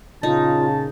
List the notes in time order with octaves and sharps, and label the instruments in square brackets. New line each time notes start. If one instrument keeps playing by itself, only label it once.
[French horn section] A#2 C#3 [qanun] D#4 [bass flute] F4 [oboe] A5